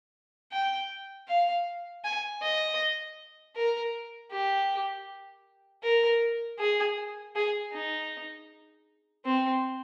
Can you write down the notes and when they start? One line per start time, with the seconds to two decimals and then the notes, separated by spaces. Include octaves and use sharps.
0.52 G5
1.28 F5
2.04 G#5
2.42 D#5
3.56 A#4
4.32 G4
5.83 A#4
6.59 G#4
7.36 G#4
7.73 D#4
9.25 C4